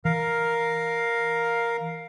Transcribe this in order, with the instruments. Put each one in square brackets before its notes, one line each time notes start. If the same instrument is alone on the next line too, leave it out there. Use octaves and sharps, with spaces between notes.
[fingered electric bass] E3 [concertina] A#4 F5